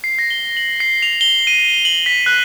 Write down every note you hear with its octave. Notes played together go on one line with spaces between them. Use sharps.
C7
A#6
G7
F#7
C7
F7
G7
D#7
F#7
B6
F#6